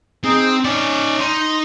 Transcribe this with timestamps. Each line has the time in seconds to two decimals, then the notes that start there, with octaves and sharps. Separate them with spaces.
0.24 C4 D#4 G#4
0.65 C#4 D#4 D5
1.20 D#4 C6